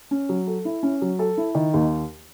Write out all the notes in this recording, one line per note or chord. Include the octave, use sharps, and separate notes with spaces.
C#4
F#3
A4
E4
C#4
F#3
A4
E4
D#3
D#2